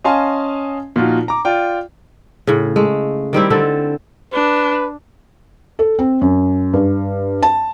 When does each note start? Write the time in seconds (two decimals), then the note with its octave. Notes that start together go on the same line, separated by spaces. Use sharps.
0.04 C#4 D#5 F5 G#5 A5 C6
0.96 A#2 F3 D#4 F4 F#4
1.28 A#5 D6
1.45 F4 D5 G5
2.47 A2 C#3
2.76 G#3 A3
3.33 D#3 G3 C4 E4
3.50 D3 C4 A4
4.33 D4 B4
5.79 A4
5.99 C4
6.21 F#2
6.73 G2
7.43 A5